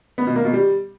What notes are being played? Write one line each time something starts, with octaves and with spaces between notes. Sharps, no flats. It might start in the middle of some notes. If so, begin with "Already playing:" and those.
B3
B2
A#3
B2
G3